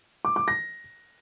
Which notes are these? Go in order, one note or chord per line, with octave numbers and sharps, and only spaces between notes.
D6
D6
A#6